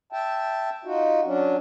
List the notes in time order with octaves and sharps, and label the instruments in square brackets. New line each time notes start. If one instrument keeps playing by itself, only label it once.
[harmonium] E5 G5 A5
D#4 F4 F#4
F#3 C#4 D4